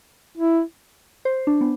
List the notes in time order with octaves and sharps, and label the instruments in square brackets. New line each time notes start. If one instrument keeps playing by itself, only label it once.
[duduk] E4
[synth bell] C5
D4
B3